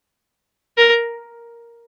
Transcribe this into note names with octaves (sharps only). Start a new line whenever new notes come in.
A#4